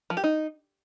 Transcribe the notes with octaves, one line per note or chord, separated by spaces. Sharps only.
F3
G4
D#4